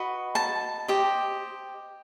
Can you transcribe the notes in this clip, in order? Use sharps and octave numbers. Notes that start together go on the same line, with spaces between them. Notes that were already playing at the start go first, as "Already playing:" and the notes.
Already playing: F#4 B4 D#5
A5
G4 C5 D#5